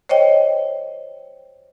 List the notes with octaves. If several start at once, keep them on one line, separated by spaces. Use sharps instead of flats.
C5 C#5 D#5 G5